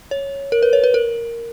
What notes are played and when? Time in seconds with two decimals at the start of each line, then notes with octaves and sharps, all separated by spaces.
0.11 C#5
0.52 A#4
0.62 B4
0.73 C#5
0.84 B4
0.94 A#4